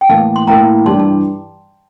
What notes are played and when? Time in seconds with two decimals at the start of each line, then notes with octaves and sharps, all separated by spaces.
0.01 G5
0.09 A2 E3 A#3 E4 F5 A5
0.36 C6
0.47 A2 E3 A#3 E4 G5 A#5
0.85 G2 E3 G3 D4 G4 A5 C6
0.99 A5